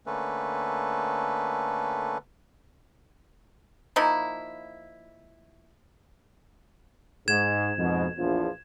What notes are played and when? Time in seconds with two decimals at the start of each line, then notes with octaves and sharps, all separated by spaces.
0.06 D3 A3 A#3 C#4 A4 B4
3.96 F3 A#3 D#4 E4
7.28 G#2 G#6 E7
7.77 F2 G#2 B2
8.17 A#1 E2 F3